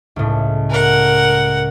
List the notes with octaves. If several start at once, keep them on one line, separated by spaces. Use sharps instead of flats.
C#2 A2
A#4 F#5